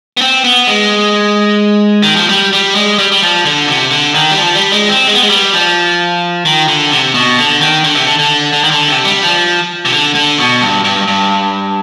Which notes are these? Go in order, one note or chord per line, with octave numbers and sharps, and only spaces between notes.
B3
C4
B3
G#3
D#3
F3
G3
G3
G#3
G3
G3
F3
D3
C3
D3
D#3
G3
F3
G3
G#3
C4
G#3
B3
G#3
G3
F3
D#3
D3
C3
B2
D3
D#3
D3
C3
D3
D3
D3
D#3
D3
C3
G3
F3
C3
D3
D3
B2
G2
G2
G2